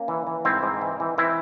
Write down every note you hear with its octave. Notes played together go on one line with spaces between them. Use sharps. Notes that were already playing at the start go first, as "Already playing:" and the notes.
Already playing: A#3 C#4
E3
E3
G#2 C4 E4
G#2
E3
E3
E3 C4 E4